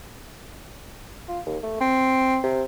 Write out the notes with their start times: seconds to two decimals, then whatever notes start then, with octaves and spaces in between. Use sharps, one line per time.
1.28 F4
1.47 D#2
1.63 A3
1.81 C4
2.44 C3